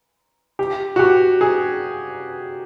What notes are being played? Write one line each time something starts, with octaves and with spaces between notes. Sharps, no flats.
G4
F#4
G4
G#4